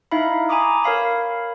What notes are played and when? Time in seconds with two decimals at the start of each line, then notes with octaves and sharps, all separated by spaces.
0.11 D#4 E4 E5 F5 B5
0.49 G#5 A#5 B5 D6 D#6
0.84 A#4 C#5 F5 B5